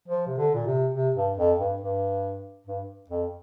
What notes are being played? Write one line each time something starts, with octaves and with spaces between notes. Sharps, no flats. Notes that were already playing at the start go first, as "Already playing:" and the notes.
F3
C3
D3
A#2
C3
C3
G2
F2
G2
G2
G2
F2